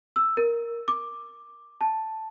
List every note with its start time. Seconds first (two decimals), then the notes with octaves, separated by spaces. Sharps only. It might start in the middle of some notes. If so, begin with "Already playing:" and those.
0.16 E6
0.37 A#4
0.88 D6
1.81 A5